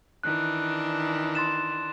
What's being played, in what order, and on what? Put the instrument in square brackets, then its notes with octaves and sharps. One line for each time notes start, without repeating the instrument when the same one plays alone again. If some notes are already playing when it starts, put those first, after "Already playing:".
[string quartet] D#3 E3 D4 [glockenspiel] F#6
[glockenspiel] C6 A6 E7